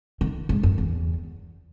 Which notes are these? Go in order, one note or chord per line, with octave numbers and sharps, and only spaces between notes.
D#3
G#2
F#2
E2